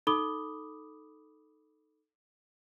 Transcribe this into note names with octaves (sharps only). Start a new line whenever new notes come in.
D#4 A4 B5 D6 D#6 G7